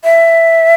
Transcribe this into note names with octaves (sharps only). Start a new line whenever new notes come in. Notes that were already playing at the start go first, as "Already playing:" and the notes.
E5